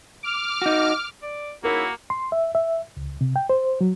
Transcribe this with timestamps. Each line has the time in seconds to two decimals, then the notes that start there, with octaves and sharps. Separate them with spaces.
0.23 D6 F6
0.62 D#4 F#4
1.23 D5
1.64 C#3 A#3 D#4 E4 F#4 A#4
2.10 C6
2.32 E5
2.55 E5
2.97 C#2
3.21 C3
3.36 G5
3.50 C5
3.81 F#3